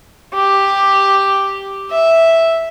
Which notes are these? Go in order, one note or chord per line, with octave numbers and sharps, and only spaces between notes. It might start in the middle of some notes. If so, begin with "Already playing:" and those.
G4
E5